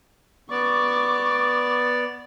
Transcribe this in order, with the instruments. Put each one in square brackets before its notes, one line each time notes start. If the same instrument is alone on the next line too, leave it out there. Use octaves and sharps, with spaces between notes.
[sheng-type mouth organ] B3 D5 [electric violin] C#6 D6